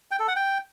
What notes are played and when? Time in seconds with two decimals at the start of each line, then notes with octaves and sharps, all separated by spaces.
0.11 G5
0.20 A4
0.28 F#5
0.36 G5